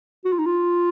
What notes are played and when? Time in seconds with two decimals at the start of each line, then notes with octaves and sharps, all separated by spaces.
0.25 F#4
0.32 F4
0.39 D#4
0.46 F4